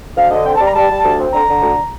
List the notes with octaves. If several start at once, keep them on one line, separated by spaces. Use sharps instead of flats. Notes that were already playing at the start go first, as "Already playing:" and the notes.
D2 F5
D3 D#5
C4 G5
A5
G3
A#5
G3 A5
G3
D2
C4
D3 A#5
D3
D2